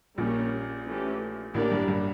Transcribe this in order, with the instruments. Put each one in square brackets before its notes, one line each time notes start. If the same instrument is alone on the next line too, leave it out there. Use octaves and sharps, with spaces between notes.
[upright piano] A#1 A#2 [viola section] G3 A#3 C#4
[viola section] E3 A3 C#4 G4
[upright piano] A1 A2 [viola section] A#3 D4 G4 A#4 D5
[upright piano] G2
G2